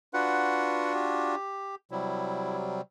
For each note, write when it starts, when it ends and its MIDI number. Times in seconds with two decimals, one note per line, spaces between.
0.14 1.35 62
0.14 1.35 65
0.14 1.35 66
0.14 0.93 71
0.14 0.93 78
0.94 1.75 67
1.91 2.81 48
1.91 2.81 54
1.91 2.81 55
1.91 2.57 64